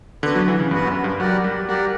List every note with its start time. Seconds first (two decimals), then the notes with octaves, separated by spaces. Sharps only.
0.23 D3 B3 F#4 B4 F#5
0.35 F#3
0.48 E3
0.60 C#3
0.71 G2 B3 F#4 B4 F#5
0.87 F#2
1.04 G2
1.20 F#3 G4 A#4 D5 F#5
1.44 G3
1.68 G3 G4 A#4 D5 F#5